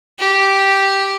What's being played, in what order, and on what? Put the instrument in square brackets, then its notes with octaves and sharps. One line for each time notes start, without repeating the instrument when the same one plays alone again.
[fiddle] G4